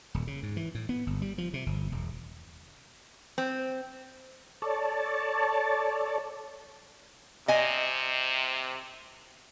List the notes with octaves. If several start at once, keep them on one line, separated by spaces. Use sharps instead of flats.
D#1
C#3
G#2
E3
A2
B3
G1
G3
F3
C3
G1
E1
C4
A4 C#5 D5 A5
C3 D#5 G#5